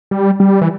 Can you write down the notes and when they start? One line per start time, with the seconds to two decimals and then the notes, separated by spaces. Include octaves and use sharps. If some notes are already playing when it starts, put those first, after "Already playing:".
0.11 G3
0.40 G3
0.61 E3